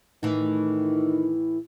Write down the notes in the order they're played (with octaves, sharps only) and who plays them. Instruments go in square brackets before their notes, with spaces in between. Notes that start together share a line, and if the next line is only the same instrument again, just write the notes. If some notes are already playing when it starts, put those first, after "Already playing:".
[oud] A2 E3 [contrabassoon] D#3